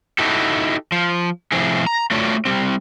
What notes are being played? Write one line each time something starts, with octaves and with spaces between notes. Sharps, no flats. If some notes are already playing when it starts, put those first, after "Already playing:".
D#4 E4 F#4 G4 A4
F3
A2 C3 F3 E4 G#4
A#5
A3 D4 F4 F#4 C#5 D5
G3 C4